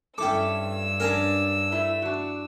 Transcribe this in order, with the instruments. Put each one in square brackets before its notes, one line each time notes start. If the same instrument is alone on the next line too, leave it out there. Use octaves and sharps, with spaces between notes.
[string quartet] G2 E6 [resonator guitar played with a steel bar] C#4 E4 A4 [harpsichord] G5 D6
[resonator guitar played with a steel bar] C#4 D4 [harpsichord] A#4 G#5 A#5
[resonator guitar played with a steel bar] A3 E4 E5
D4 F#4